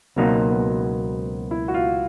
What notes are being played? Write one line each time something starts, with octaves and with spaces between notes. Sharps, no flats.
C#2 B2 F#3 A#3 C4 D#4
B3
E4
F#4
F4